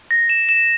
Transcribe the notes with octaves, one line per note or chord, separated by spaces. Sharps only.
A#6
E7
E7